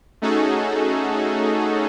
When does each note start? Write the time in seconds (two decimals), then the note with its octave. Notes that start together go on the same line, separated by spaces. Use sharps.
0.22 A3 C#4 D#4 F#4 G#4 A4